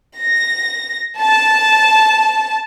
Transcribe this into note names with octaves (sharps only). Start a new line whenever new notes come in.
A#6
A5